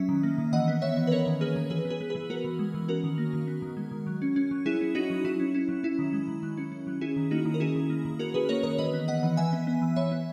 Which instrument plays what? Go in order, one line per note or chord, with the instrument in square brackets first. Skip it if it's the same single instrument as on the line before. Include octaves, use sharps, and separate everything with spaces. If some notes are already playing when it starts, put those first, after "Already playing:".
Already playing: [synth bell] F#3 C#4 E5
D#3
A#3
D#3
E3 D#5 F#5
B3
B3 C#5 E5
E3
B4
C#4 A#4 C#5
D#3
A#3 G#4 B4
D#3
E3 G#4 B4
B3
G#4 B4
B3
E3 G#4 B4
B3 F#4 A#4
E3
G#3
E3
C#4 F#4 A#4
D#3
A#3
D#3
B3
D#3
G#3
D#3
F#3
C#4
C#4
F#3
F#3 E4 G#4
C#4
C#4 D#4 F#4
F#3
F#3 E4
C#4
C#4 E4
F#3
C#4 E4
D#3
G#3
D#3
F#3
C#4
C#4
F#3
C#4 E4 G#4
D#3
A#3 D#4 F#4
D#3
A#4
C#4 E4 G#4
D#3
A#3
D#3
C#4 F#4 A#4
D#3 G#4 B4
A#3 A#4 C#5
D#3 A#4 C#5
E3 B4 D#5
B3
B3 D#5 F#5
E3
E3 E5 G#5
B3
B3
E3
E3 C#5 E5
B3